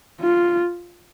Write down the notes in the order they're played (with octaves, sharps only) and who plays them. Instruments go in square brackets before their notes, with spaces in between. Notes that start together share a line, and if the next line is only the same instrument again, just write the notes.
[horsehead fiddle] F4